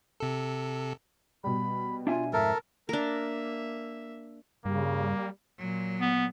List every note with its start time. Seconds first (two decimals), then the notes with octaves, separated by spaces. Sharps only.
0.20 C3 A4
1.44 B2 G3 B5
2.07 D4 F4 E5 G#5
2.33 F2 G#2 F3 A4 A#4 E5
2.89 A#3 D4 A#4 E5
4.65 G2 C#3 G3 A#3
5.58 A#2 F#3
6.00 B3